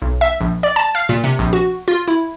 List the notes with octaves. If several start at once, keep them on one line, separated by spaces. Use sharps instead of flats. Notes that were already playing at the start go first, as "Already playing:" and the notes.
B1
E5
A#1
D5
A5
F5
A#2
C3
A#1
F#4
F4
E4